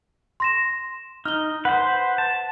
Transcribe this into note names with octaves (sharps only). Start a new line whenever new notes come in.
C6 A#6 E7
D#4 F6 G7
B4 C5 F#5
A5